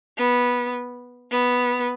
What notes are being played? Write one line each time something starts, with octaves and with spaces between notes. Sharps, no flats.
B3
B3